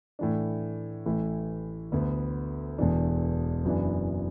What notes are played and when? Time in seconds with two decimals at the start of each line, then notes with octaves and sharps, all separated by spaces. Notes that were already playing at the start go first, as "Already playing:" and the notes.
0.19 A2 E3 D4
1.06 A1 A2 E3
1.92 D2 D3 B3
2.78 E1 E2 E3 D4
3.65 F#1 F#2 E3 B3 D4